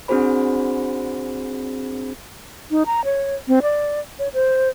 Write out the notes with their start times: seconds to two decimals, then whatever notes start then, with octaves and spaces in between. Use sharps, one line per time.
0.08 C4 D4 F#4 G#4 C5 B5
2.71 D#4
2.86 A#5
3.05 C#5
3.48 C4
3.62 D5
4.19 C#5
4.34 C5